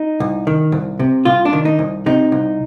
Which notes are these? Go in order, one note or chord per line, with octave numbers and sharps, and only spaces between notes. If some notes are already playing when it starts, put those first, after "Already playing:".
Already playing: D#4
C2
D#3
C2
C3
C2 F4
D4
D#3
D#4
C2
C3 D#4
C2